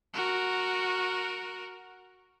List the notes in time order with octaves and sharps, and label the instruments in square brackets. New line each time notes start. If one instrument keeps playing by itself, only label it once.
[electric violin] F#4 A#4